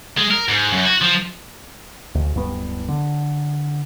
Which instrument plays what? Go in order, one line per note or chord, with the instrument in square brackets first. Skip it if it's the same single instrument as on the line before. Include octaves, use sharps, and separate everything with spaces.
[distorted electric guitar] G#3
A#4
G#2
F#2
F#4
F3
[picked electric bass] D2
D1 G2 B3
D3